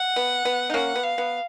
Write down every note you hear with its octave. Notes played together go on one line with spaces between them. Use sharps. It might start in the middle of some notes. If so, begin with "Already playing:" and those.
Already playing: F#5
B3
B3
D#4
A#3 C#4 F#5
B3
F5
B3